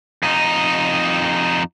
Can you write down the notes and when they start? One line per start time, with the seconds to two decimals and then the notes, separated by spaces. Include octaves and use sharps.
0.23 F2 D#4